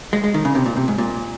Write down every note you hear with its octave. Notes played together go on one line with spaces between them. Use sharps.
G#3
G#3
D#3
C#3
C3
A#2
C3
G#2
A#2